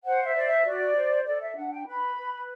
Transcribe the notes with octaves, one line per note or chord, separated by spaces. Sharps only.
C5 F#5
E5
C5 D5
E5
F#4 D5
C5
A4 D5
E5
D4 F#5
G5
B4 B5
B4